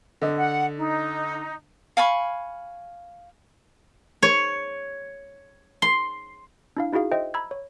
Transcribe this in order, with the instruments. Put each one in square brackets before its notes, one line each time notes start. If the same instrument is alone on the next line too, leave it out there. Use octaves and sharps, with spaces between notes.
[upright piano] D3 D#5
[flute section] F#5
D#4
[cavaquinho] F5 G#5 B5 C#6
[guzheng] C#5
C6
[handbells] D4 E4 F5
D#4 E4 F#4 G#4 F5
C5 D#5 E5 G5
A#5 B5 E6 G#6
C#5